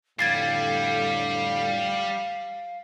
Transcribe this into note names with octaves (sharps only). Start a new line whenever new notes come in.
F2 A2 D3 G3 F5 G#6 A6 C7